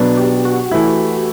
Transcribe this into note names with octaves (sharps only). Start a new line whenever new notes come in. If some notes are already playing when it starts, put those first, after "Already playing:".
Already playing: B2 F#3 B3 D4
G4
F#4
E3 A3 E4